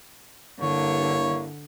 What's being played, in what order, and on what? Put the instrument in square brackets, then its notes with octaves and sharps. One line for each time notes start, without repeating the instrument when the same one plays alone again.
[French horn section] G2 A#3 E4 [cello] D3 [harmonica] C#5